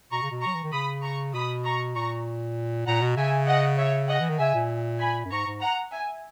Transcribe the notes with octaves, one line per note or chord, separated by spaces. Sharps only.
B2 A#5 C#6
C#3
B2
F#3 A#5 C#6
E3
D#3
C#3 B5 D#6
A#5 C#6
B2 B5 D#6
A#5 C#6
A#2 A#5 C#6
A#2 F#5 A#5
B2
C#3 E5 G#5
D#5 F#5
C#5 E5
D#5 F#5
E3
D#3
C#3 E5 G#5
A#2
G#5 B5
F#2
G#2 A#5 C#6
G#2
F#5 A#5
E5 G#5